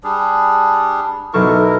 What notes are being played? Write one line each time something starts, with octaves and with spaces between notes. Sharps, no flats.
G3 D4 G#4
B1 E4 A4 A#4 C#6